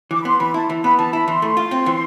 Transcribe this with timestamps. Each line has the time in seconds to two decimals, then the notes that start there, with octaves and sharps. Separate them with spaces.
0.11 E3 D6
0.21 B5
0.25 B3 C6
0.40 E3 B5
0.54 E4 A5
0.70 E3
0.84 B3 B5
0.98 E3 A5
1.13 E4 B5
1.28 E3 C6
1.42 A3
1.57 F4
1.71 C4
1.86 E3